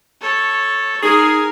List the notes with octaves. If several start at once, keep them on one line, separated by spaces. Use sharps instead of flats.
A4 C#5
D#4 G#4 A#4